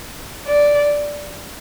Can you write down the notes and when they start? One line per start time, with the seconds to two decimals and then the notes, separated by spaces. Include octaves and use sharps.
0.47 D5